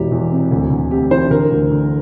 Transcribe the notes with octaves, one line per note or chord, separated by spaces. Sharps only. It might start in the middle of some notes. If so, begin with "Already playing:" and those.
Already playing: E1 E3 G4
E2
C3
D2
D2
C3 G4
E3 C5
D3 A#4
D2
D3